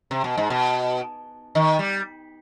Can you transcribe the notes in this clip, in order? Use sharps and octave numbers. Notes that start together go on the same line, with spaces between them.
C3
B2
G#2
B2
D#3
G3